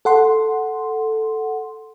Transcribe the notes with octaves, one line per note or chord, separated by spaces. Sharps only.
A4 F#5 C6